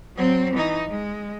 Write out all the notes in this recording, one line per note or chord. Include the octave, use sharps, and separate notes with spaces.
F#3 C4
E3 D#4
G#3